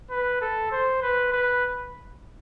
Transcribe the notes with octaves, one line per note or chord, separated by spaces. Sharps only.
B4
A4
C5
B4
B4